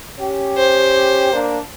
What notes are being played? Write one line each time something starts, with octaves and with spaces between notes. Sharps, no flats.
C#4 G4
C5
A#3 D4